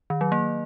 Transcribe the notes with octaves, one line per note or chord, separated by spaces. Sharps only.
D#3
F#3
A#3